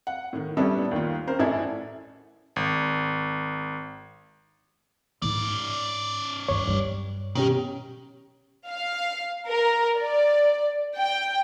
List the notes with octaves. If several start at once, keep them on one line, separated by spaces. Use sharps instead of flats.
F#5
A2 D#3
G3 B3 C#4 D4 E4 A4
D#2 D#3 F4
C#4 A#4 C5
A1 D4 E4 A4 G#5 G#6
G#1
G#2 D3 C#4 D5
D2 G2 C#5
G2 F#3 G3
B2 D#3 C#4 G4
F5
A#4
D5
G5